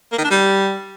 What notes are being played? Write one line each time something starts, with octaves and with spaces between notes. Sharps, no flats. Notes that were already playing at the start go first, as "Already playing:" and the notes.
A#3
D#3
D4
G3